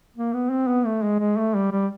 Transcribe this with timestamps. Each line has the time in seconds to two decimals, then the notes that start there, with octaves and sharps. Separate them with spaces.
0.16 A#3
0.33 B3
0.50 C4
0.68 B3
0.85 A3
1.03 G#3
1.19 G#3
1.37 A3
1.55 G3
1.72 G3